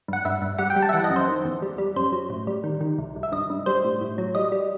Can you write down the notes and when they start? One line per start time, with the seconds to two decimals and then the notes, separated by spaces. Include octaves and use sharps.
0.08 G2 F#5
0.25 G2 E5
0.42 G2
0.58 G3 F#5
0.70 G5
0.76 G3
0.82 A5
0.89 E5
0.93 E3 F#5
1.04 D#5
1.10 F#2
1.16 C5
1.28 D#3
1.45 E2
1.62 G3
1.78 G3
1.96 F#2 C5
2.12 F#3
2.30 A2
2.47 G3
2.64 D#3
2.81 D#3
2.98 C2
3.16 C2
3.23 E5
3.32 G2 D#5
3.50 G2
3.66 G3 C5
3.84 A2
4.01 A2
4.18 F#3
4.35 G3 D#5
4.52 G3